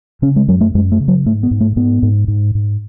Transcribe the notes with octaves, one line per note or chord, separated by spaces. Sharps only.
C#3 C#4
G#3
F#2 F#3
A3
F#2 G#3
A3
C#3
F#3
G#2 A3
B3
G#2
A3
G#2 B3
G#2
G#2
G#2